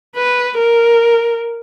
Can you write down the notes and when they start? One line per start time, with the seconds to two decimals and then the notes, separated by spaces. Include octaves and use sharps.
0.16 B4
0.59 A#4